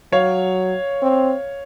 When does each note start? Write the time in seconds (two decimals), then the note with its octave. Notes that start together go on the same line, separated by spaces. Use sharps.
0.12 F#3 C#5 F5
1.02 C4